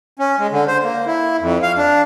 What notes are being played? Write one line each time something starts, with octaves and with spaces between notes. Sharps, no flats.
C#4
G#3
D3
C5
A#3
E4
F2
F5
D4